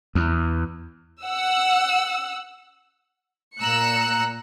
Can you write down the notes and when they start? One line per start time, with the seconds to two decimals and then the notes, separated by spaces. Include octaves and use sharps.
0.15 E2
1.23 F#5 E6
3.58 A#2 A#5 E6 F#6 C#7